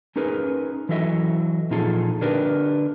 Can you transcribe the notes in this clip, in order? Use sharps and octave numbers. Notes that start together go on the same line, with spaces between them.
C#4 D#4 G#4 A#4 B4
E3 F#3 E4 A4 D#5 E5
A#2 F3 D#4 F4 G#4 A4
D3 D4 G4 A#4 B4